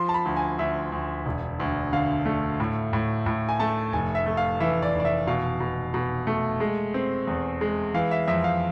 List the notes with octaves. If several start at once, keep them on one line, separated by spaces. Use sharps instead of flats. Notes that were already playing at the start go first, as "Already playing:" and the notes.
Already playing: F3 C6
A5
B5
D2
G#5
D2 E5
D2
E1
D2
D3 F5
A3
A2
A2
A2
G#5
A3 A5
F1 G#5
E5
A3
F5
E3 E5
D5
F1
D5
E5
B2 F5
B2
B2
A3
G#3
C4
E2
G#3
E3 F5
E5
F2 E5
F5